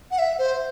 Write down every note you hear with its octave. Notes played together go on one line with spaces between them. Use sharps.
F#5
E5
C5